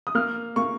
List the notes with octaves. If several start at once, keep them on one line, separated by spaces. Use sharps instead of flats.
D#6
A#3 F6
A#3 C#6